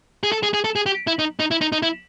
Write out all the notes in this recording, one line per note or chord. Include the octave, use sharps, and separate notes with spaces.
G#4
A4
G#4
G#4
A4
G#4
G4
E4
D#4
D#4
E4
D#4
D#4
E4